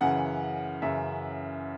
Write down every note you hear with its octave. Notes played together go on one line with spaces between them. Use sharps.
F#2 C#3 E3 F#5
F#2 C#3 E3 E5